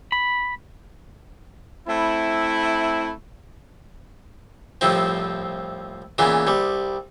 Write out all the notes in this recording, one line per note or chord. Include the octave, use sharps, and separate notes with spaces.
B5
A3 C4 E4
C2 A2 F3 C4
A#2 C#3 E3 B3
C2 G3